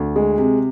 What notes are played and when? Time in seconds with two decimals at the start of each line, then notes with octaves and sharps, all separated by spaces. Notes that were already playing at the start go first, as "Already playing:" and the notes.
Already playing: D2
0.16 G#3
0.38 C3